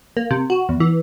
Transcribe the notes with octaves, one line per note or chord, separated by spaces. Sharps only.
A#3
C3
F#4
E2
E3